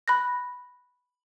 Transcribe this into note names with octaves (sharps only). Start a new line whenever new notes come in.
B5 F#6 A#6